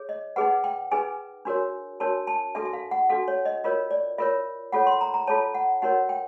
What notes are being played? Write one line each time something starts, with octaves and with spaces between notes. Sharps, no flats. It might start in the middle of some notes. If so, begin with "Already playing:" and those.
Already playing: G#4 C#5
D#5
D#4 G#4 B4 F#5
G5
D#4 G#4 B4 G#5
D4 F#4 A#4 C#5
D4 F#4 A#4 C#5 A5
A5
D4 F#4 A4 E5
E5
F5
F#5
D4 F#4 A4 F5
C#5
D#5
F4 A#4 C#5 D#5
D5
F4 A#4 C#5 E5
F4 A4 C#5 F#5
C6
A#5
A#5
F4 A4 C#5 A5
F#5
D#4 F#4 A#4 C#5 F#5
G5